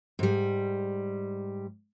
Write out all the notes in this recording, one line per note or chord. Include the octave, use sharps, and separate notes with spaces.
G#2 G3